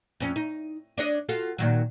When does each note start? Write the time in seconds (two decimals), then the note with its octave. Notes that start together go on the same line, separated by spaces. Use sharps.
0.20 F2 C#4
0.36 D#4
0.98 D4 C#5 D#5
1.29 F4 F#4 A4
1.58 A#2 D#3 F#3